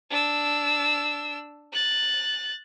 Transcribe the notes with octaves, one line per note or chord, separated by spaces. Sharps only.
D4 E6
F#6 A6